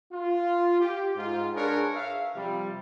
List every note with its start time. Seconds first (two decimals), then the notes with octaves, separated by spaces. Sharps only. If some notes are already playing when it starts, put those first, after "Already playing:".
0.11 F4
0.79 G4
1.16 G#2 F4
1.55 D4 G#4 A#4 B4 C#5
1.94 E5 F5
2.35 C3 F3 G3